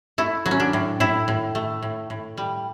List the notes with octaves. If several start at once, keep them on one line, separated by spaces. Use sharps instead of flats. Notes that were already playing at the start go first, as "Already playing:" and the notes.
A3 E4
F#3
C#4
D4
A2
A2 E4
A2
A3
A2
A2
G3